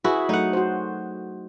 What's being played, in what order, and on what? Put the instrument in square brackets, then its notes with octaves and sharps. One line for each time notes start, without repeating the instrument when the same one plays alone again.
[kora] E4 F#4 B4 [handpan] G#4
[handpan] F#3 A3 [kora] D#4 F#5
[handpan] F#4 C5